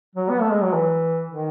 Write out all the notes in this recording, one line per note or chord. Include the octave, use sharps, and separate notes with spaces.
F#3
B3
A3
G#3
F#3
E3
D#3